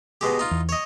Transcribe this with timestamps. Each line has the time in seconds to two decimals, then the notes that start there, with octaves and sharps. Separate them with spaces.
0.21 B2 G#3 G4
0.39 D#4 F4
0.51 E2
0.69 C#5 D#5